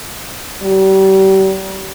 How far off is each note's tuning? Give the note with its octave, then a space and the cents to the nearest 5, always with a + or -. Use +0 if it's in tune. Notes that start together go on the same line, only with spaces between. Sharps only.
G3 -35